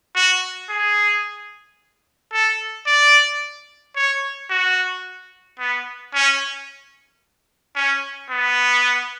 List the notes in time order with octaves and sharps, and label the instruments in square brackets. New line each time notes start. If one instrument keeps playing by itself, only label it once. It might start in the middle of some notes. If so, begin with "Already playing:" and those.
[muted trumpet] F#4
G#4
A4
D5
C#5
F#4
B3
C#4
C#4
B3